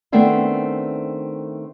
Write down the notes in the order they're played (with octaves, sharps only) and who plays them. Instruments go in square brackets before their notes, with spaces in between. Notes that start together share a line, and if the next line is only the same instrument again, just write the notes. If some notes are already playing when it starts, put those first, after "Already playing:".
[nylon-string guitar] D#3 A3 B3 C4 D4 E4